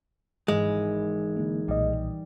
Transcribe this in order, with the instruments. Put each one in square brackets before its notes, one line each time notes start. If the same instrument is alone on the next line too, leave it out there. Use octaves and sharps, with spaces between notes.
[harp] G#1 G#2 E3 [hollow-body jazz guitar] G#3
[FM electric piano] D3 A#3
[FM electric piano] B1 A#2 D#5 [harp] G3